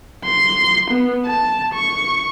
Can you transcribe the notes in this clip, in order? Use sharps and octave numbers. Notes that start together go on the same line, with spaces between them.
C6
B3
A5
C#6